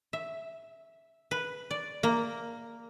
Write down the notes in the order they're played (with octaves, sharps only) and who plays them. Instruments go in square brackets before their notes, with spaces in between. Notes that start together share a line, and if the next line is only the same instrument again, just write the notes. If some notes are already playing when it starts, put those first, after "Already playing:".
[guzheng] E5
B4
D5
A#3